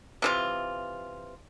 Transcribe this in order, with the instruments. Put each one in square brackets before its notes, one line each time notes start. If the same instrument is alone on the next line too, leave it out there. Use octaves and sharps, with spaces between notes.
[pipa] C3 E3 F4